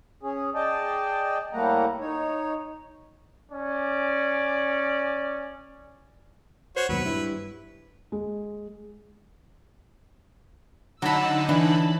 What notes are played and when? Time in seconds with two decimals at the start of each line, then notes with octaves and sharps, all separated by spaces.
0.23 C#4 G#4
0.55 G#4 D5 D#5 G5 A5
1.53 A2 G3 A3 A#3 F#5 A#5
2.01 D#4 C#5
3.52 C#4 D5
6.76 F#4 C5 C#5
6.89 D#2 G#2 B2 F#3 B4
7.05 G2 E4
8.12 G#3
11.02 D3 F#3 D#4 F#5 A5 B5 E6
11.49 E3 D4 A5 B5